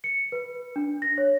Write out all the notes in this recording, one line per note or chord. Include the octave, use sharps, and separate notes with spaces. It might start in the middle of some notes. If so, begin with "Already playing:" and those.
C#7
B4
D4
A#6
C#5